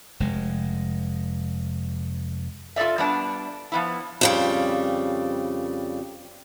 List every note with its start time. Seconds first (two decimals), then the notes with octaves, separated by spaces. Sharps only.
0.20 F1 G#3
2.76 F4 A4 C5 D5 E5
2.98 G3 B3 D4
3.72 F3 B3 E4
4.21 F2 C#3 G3